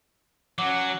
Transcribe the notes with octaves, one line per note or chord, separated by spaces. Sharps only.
F#3 C#4 F#4 F#5 D6